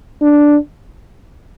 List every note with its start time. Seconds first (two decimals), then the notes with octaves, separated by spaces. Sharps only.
0.22 D4